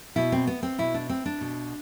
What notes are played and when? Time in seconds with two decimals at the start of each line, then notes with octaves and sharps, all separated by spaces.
0.16 B2 E4
0.32 C4
0.47 B3
0.63 C4
0.78 B2 E4
0.94 D4
1.09 C4
1.26 D4
1.41 B2